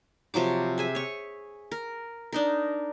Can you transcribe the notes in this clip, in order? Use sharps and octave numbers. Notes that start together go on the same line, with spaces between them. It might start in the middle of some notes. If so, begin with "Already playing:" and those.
C3 F3 F#3 D6
G#4 E5 G#5
C#5 C#6
A#4
D4 D#4 A#4